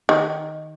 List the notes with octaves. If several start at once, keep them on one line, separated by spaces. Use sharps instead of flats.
D#3